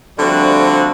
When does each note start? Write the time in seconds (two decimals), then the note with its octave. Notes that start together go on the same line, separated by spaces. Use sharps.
0.18 D3 F3 G3 A3 C4 F#4